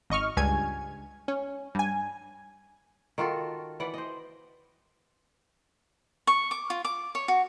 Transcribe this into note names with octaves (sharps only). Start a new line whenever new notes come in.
G#1 D#5 C#6 F6
C#2 G2 G#5 G#6
C#4
G2 G#5
D#3 F4 F#4 A4
E3 B4 D5 F#5
C5 D#5
C#6
D6
F4
D6
C#5
F#4